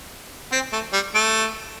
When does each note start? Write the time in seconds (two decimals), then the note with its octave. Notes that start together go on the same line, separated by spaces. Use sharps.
0.52 C4
0.73 A3
0.93 G3
1.15 A3